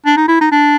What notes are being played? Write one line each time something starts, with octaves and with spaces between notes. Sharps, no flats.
D4
D#4
E4
D#4
D4